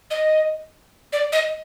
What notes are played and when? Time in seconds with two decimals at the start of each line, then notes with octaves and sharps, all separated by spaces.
0.11 D#5
1.13 D5
1.32 D#5